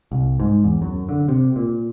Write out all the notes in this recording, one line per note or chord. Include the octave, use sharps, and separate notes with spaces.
C2
G#2
E2
F#2
D3
C3
A#2